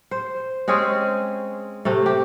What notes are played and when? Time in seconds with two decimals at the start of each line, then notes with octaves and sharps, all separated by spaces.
0.11 C5
0.68 G#3 C4 C#4 G#4
1.85 C3 A3
2.06 G4